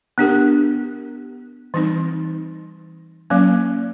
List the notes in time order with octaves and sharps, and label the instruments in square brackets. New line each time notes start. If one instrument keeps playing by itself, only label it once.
[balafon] B3 D4 G4 A#4
E3 G3 C4 D#4
F#3 A#3 C#4